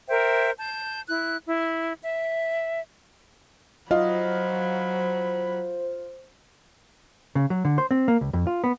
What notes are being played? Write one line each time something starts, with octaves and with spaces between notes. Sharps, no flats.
A#4 C5 E5 G5
A5 G6
E4 F#6
E4
E5
F#3 F4 C5 D#5 B5
C#3
F#3
D3
C5
C4
A#3
C#2
F2
F4
B3